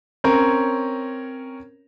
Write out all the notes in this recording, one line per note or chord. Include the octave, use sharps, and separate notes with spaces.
C4 C#4 A#4 C#5